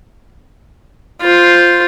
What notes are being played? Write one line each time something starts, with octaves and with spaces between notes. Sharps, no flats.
F4 C5